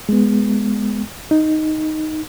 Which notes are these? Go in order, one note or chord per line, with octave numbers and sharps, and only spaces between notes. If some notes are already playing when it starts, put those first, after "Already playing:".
G#3 B3
D#4